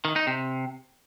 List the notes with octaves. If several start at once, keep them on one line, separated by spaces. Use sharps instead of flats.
D#3
D#4
C3